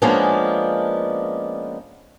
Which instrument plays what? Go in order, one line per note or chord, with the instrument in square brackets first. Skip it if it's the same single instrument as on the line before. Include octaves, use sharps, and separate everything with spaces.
[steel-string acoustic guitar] F3 G#3 A#3 B3 C#4 D4